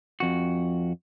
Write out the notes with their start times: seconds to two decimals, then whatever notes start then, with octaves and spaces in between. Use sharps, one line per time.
0.20 F2 F#4